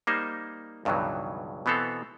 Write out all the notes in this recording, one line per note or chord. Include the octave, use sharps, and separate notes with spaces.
G3 A#3 D#4 C5
C#2 G2 B2 D#3 E3 F#3
B2 E3 B3 C4 A4 F5